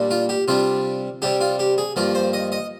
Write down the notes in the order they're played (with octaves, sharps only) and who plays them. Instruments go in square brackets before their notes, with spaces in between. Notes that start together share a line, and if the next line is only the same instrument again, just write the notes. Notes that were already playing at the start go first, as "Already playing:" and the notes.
Already playing: [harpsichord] A#2 G3 D4
F4
G4
C3 G3 D4 F4
C3 G3 D4 G4
F4
G4
G#4
G2 F3 A#3 F4
C5
D#5
D#5